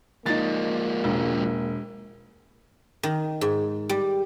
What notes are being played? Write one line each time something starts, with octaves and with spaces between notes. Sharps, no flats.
F3 G#3 A#3 D#4 A6
E1
D#3
G#2
G3